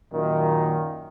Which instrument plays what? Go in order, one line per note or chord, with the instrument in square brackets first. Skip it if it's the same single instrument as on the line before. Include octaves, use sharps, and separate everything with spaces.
[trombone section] F#2 A#2 D#3